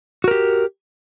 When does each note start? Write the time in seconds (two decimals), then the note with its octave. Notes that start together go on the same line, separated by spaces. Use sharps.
0.24 F#4
0.28 A#4
0.31 G4